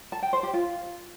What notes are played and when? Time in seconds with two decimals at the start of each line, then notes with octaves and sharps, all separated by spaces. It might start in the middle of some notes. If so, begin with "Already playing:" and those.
0.12 A5
0.22 G5
0.33 C5
0.43 G4
0.53 F4